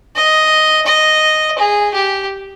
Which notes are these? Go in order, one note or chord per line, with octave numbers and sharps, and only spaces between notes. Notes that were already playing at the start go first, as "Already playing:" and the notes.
D#5
D#5
G#4
G4